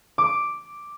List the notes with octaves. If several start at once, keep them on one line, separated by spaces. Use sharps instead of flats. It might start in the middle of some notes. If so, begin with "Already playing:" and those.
D6